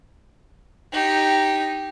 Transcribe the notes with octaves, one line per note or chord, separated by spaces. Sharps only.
D#4 G4